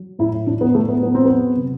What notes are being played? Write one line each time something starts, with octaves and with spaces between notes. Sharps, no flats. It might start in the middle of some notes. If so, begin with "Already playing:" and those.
Already playing: F#3
A2 E4
A2 D4
B3
A2 A3
B3
F#3 B3
C4
B3
F#3
C3